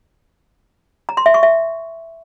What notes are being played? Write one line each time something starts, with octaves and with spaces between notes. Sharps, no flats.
A#5
C6
E5
C#6
E5